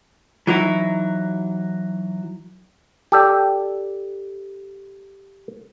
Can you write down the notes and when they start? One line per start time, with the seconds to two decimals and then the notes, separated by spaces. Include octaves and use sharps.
0.47 E3 F#3 D#4 E4
3.12 G4 A4 D5